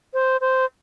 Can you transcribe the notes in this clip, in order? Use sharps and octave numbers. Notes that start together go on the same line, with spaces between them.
C5
C5